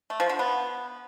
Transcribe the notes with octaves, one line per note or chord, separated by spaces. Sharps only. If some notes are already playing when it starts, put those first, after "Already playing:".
A3
F3
D3
B3